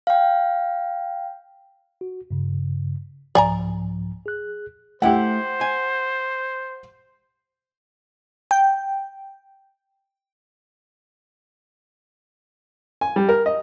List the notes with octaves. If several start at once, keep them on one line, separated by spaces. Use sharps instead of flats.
F5 G5
F#4
G2 C#3
C2 G#2 F3 D5 G#5 A#5
G#4 F#6
A3 E4 G4 C5 F#5
G#5
G5
G#5
G3
A#4
D#5